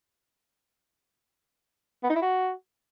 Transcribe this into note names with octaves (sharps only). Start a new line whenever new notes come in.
B3
D#4
E4
F#4